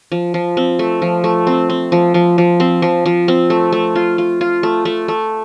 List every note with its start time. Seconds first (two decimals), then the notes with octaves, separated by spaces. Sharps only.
0.12 F3
0.34 F3
0.57 C4
0.79 A3
1.02 F3
1.24 A3
1.47 C4
1.70 C4
1.92 F3
2.14 F3
2.38 F3
2.60 C4
2.82 F3
3.06 F3
3.28 C4
3.50 A3
3.72 A3
3.96 F4
4.18 F4
4.41 F4
4.63 A3
4.85 A3
5.08 A3